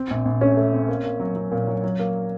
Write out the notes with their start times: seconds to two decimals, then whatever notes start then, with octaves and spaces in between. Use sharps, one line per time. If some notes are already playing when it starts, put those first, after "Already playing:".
Already playing: C4
0.11 A#1
0.25 A#1
0.41 A3 C#4
0.57 A3
0.72 C4
0.88 A#3
1.04 A#3
1.20 F#3
1.36 F#3
1.52 A#2
1.67 F#3
1.83 F#3
1.99 A#3